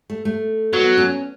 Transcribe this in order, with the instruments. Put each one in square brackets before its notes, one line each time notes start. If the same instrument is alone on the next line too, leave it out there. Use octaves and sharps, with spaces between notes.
[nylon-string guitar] A3
A3
[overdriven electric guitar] F#3 [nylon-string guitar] B3
[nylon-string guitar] C#4